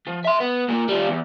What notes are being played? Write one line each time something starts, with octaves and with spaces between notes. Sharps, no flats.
F3
E5 C6
B3
A#2 A#3
G3 F4
E2